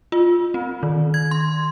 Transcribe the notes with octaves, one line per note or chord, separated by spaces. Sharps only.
F4
C4
D#3
G#6
C6